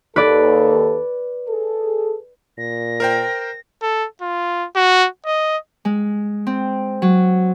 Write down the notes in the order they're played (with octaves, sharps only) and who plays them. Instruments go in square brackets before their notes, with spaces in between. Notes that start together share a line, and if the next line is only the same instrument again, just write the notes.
[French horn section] D#2 A4 [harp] B4 D5
[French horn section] G#4 A4
[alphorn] A#2 [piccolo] A#6
[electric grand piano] A#4 C5 G5
[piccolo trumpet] A4
F4
F#4
D#5
[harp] G#3
C4
F#3